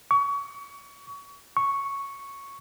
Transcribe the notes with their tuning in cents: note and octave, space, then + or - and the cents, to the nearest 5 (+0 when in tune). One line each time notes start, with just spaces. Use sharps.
C#6 +30
C#6 +0